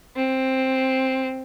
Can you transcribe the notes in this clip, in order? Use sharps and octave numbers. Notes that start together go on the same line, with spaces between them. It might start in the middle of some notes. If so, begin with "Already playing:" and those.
C4